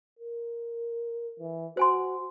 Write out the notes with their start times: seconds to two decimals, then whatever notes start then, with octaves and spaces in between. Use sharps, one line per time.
0.19 A#4
1.39 E3
1.77 F#4 C5 G#5 C6